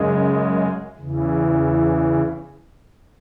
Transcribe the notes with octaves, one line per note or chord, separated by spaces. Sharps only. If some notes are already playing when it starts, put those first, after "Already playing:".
Already playing: F#2 C#3 G#3
E2 C#3 E3